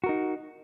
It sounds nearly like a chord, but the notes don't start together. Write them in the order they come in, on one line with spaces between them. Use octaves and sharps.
F#4 A#4 D#4